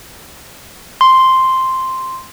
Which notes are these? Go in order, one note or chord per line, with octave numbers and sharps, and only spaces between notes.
C6